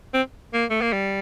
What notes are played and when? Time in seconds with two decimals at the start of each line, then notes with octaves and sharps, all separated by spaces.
0.14 C4
0.53 A#3
0.70 A3
0.81 A#3
0.92 G3